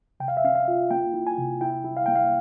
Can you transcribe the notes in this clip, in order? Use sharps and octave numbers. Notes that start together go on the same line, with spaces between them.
C3 G5
F5
E5
C#4 F5
F5
F4
A#3 G5
E4
G#5
C3
E4 G5
E4
F5
A#3 G5
F5